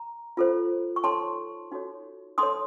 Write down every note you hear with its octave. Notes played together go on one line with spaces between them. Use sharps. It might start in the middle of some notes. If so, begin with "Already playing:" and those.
Already playing: A#5
F4 A4 C5
C#6
D#4 A4 C#5 A5 C6
D#4 F#4 A4 C#5
D#4 A4 C#5 C6 D#6